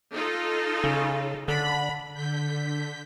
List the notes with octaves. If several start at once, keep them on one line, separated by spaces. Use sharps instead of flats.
D#4 F4 A4
C#3
D3 B5
D3 G6 B6